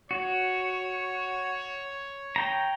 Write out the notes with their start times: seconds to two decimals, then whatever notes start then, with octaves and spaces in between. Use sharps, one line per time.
0.11 F#4 C#5
2.36 G5 A#5